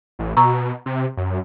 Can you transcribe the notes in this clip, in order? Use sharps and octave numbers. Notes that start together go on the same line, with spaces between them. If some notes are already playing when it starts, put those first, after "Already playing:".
A1
B2 A#5 C#6 E6
C3
F#2